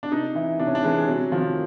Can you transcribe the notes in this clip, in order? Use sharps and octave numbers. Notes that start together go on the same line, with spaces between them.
D4
C3 D#4
E3 E4
C3 D4
C#4
D4
E3 G#3
C3 F#3
D#3 F3